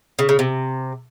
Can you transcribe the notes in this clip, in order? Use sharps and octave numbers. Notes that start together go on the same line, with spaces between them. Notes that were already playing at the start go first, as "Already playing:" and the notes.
C#3
C#3
C3